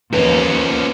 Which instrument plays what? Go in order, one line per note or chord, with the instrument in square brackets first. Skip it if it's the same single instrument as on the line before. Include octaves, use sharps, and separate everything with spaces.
[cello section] D#2 [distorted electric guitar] F3 C#4 [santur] B4